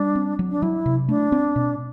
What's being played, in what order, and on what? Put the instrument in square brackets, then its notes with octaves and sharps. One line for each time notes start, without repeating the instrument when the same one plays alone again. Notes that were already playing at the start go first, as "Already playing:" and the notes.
Already playing: [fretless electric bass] G3 [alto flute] D4
[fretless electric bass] C4
F#3
[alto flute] D4
[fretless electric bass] F#3 [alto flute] E4
[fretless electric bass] C3
[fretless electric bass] A3 [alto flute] D4
[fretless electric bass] C4
B2